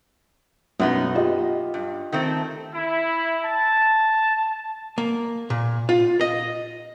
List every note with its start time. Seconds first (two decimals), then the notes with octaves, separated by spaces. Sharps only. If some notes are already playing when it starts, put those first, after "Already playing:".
0.80 B1 F#2 B3 D#4
1.15 F4 G4 D#5
1.74 G2
2.12 D#3 A3 C4
2.73 E4
3.45 A5
4.98 A#3
5.50 A#2
5.89 F4
6.21 D#5